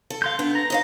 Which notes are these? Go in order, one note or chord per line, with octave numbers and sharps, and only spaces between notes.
A4
F5 C6 G6
B3 D4
A#5 A#6
D#4 C#5 F5